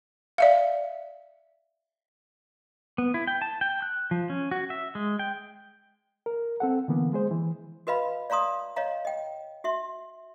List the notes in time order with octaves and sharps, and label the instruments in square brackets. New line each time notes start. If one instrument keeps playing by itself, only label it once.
[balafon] D5 E5 F5
[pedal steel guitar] B3
E4
G5
A5
G5
F#6
F3
C#4
F#4
E5
G#3
G5
[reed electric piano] A#4
C4 A4 F#5
D3 E3 A#3 B3
G#3 G#4 C5
E3
[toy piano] F#4 B4 D#5 F5 B5
D5 F5 A#5 C6 D#6
C#5 D#5 F5 A#5
D#5 G5
F#4 E5 C6